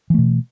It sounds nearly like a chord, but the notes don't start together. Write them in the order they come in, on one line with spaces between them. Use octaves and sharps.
E3 A3 B2